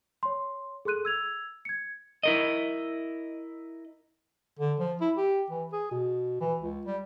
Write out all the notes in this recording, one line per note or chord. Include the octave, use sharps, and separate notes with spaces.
C#5 C6
G#4 A4 C6 F#6 D#7
E6 G#6 F7
G#6 C#7
E4 A#4 D#5
D3
F3
E4
G4
E3
G#4
B2
E3
C#2
G3